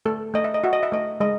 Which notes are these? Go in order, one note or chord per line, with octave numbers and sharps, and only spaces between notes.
A3 A4
A3 D#5
E5
D#5
F#4 E5
D#5
E5
A3 D#5
G#3 D#5